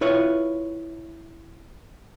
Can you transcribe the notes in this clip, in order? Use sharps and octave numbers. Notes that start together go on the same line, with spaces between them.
E4 F4 B4 C#5